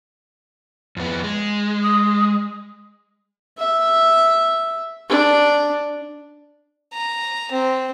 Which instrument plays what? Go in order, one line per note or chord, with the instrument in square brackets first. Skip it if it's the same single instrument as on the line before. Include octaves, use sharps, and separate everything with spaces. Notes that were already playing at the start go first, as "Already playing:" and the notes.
[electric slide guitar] F2 B3
G#3
[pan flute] D#6
[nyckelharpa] E5
D4
[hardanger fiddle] A#5
C4